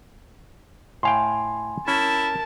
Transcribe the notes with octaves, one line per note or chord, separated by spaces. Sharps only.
A2 F5 G5 G#5 C6
C#4 E4 A#4 A5